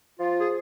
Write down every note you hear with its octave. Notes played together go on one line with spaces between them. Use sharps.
F3 F4
G#4